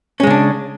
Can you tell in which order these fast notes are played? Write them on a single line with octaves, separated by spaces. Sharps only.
C#4 G#3 C#3 D4